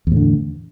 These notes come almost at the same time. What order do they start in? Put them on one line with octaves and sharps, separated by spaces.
E2 A2 D3